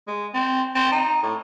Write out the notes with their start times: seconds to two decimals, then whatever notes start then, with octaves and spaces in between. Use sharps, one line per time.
0.07 G#3
0.34 C4
0.75 C4
0.92 D#4
1.23 A2